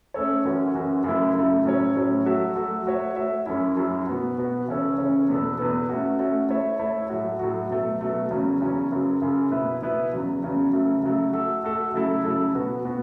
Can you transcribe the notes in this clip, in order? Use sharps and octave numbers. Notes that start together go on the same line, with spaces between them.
A3 C#4 A4 C#5
F#2 E3 C#4 F#4
F#2 E3 C#4 F#4
F#2 C#3 F#3 A3 E4
F#2 C#3 F#3 A3 E4
A2 F#3 C#4 A4 C#5
A2 F#3 C#4 A4 C#5
F#3 A3 F#4 A4 E5
F#3 A3 F#4 A4 E5
A3 F#4 C#5 E5
A3 F#4 C#5 E5
F#2 F#3 C#4 E4
F#2 F#3 C#4 E4
B2 B3 F#4
B2 B3 F#4
C#3 E3 C#4 A4 C#5
C#3 E3 C#4 A4 C#5
E2 B2 B3 A4
E2 B2 B3 A4
A3 C#4 F#4
A3 C#4 F#4
A3 E4 C#5 E5
A3 E4 C#5 E5
A2 F#3 A3 F#4
A2 F#3 A3 F#4
B2 F#3 A3
B2 F#3 A3
E2 C#3 F#3 C#4
E2 C#3 F#3 C#4
F#2 C#3 F#3
F#2 C#3 F#3
B2 B3 E4 B4 E5
B2 B3 E4 B4 E5
E2 C#3 F#3
E2 C#3 F#3
C#3 F#3 A3
C#3 F#3 A3
A3 F#4 A4 E5
A3 F#4 A4 E5
C#3 F#3 A3 E4 A4
C#3 F#3 A3 E4 A4
B2 B3 F#4
B2 B3 F#4